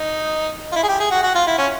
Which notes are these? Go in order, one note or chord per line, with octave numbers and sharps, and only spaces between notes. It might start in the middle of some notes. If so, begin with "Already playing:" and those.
Already playing: D#4
F4
E4
G#4
G4
G#4
F#4
F#4
F4
E4
C#4